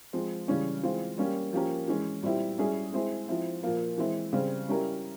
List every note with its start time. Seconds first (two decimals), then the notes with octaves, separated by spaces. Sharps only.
0.13 F3 G#3 C4
0.48 C#3 E3 G3 C#4
0.83 E3 G#3 C4 F4
1.18 G3 A#3 C#4 G4
1.53 F3 A#3 C#4 G4 A#4
1.88 E3 G#3 C#4
2.22 A#2 G3 C4 E4 G4
2.58 G3 C#4 E4 G#4
2.92 G#3 C4 E4 G#4
3.28 F3 C4 E4
3.63 A#2 F3 A#3
3.98 E3 G#3 C4 E4
4.33 C#3 G3 C4
4.68 G3 C#4 E4 G4 A#4